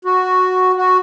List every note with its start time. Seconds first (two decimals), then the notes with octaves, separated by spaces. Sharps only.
0.05 F#4
0.76 F#4